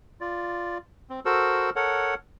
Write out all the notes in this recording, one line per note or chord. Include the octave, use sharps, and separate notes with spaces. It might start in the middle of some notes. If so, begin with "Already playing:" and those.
F4 D5
C4
F#4 A4 A#4 C5 E6
A4 A#4 C#5 F#5